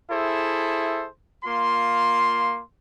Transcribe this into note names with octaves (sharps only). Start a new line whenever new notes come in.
E4 G#4 A4 C5 E5
A#3 F4 C6